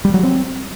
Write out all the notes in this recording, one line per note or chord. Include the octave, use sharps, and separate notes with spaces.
G3
F#3
C4